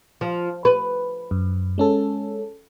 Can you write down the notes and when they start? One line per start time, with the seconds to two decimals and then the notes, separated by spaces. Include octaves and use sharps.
0.21 F3
0.65 B4
1.31 F#2
1.78 G#3 C#4 A4